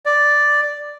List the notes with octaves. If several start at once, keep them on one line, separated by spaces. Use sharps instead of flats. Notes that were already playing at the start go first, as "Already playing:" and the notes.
D5